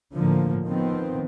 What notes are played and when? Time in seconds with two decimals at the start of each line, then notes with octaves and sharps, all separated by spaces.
0.16 A2 D3 F3 A#3
0.67 D#3 F3 B3 C4